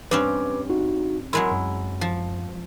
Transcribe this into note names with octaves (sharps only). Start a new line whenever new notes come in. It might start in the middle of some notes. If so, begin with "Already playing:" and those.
G2 C4 C#4 B4 D6
D#4 F#4
F#3 G#3 E4 A#4 C6
F#2
F3